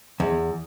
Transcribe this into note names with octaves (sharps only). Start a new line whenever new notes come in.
E2